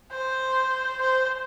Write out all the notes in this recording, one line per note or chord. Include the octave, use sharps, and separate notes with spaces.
C5
C5